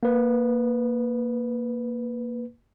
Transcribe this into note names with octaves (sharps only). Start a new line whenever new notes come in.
A#3 B4